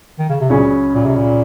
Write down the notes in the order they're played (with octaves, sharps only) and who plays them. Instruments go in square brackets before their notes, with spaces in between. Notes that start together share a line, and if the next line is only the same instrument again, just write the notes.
[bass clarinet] D#3
C#3
C3
[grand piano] C#2 C#3 F#3 C#4 G#4 [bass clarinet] A#2
[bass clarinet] A#2
C3
A#2